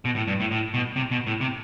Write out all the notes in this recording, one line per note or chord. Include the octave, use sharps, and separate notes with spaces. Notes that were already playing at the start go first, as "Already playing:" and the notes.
B2
A2
G2
A2
A2
B2
C3
B2
A2
C3